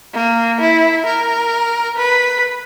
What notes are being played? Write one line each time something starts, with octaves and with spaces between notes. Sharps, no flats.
A#3
E4
A#4
B4